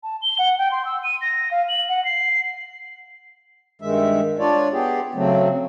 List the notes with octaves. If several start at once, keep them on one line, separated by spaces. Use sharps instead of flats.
A5
G7
F#5
G5
C6
E6
D#7
A#6
F5
F#7
F#5
C7
G2 D#3 G#3 E5
D4 F4 C#5 D5
B3 G4 G#4
C#3 F#3 A3 C4